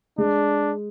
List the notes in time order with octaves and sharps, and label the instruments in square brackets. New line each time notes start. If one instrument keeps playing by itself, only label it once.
[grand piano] G#3 [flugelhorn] D4